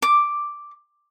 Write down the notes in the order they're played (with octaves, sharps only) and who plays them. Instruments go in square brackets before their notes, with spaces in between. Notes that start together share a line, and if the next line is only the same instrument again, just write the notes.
[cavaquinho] D6